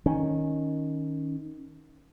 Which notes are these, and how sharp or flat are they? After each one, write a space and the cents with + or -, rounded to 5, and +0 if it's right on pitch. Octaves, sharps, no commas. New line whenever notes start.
D#3 +0 C#4 +0